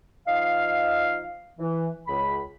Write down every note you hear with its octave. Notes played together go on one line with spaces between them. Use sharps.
F3 D#4 D#5 F5
E3
C#2 B5